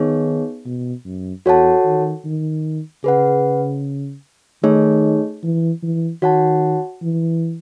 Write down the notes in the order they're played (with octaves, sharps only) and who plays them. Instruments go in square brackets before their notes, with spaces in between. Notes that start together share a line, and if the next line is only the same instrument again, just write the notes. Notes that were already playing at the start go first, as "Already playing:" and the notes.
Already playing: [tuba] D#3 [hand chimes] B3 D#4 G#4 C#5
[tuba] B2
F#2
[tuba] E2 [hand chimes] F#4 A4 C#5 F#5 A5
[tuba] D#3
D#3
[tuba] C#3 [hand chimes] G#4 B4 F#5
[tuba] D#3 [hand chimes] A3 D#4 G#4 C#5
[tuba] E3
E3
[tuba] D#3 [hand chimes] F#4 C#5 F#5 A5
[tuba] E3